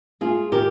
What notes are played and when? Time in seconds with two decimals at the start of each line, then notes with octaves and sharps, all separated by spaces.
0.21 G#3 F4 G#4
0.52 D#3 G4 A#4